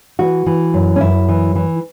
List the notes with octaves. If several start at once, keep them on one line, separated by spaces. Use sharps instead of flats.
E3 F#4
E3
F#2
C#4
F#2 E4
E3
E3